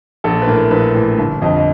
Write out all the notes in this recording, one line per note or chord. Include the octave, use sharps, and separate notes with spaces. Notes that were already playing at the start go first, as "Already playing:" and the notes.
A#1 A4
B4
A2 E3 A#4
A#1 B4
A2 E3
G1
F2 D3 D#5
D#5